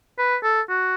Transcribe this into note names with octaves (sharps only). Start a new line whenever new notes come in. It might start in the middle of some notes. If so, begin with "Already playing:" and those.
B4
A4
F#4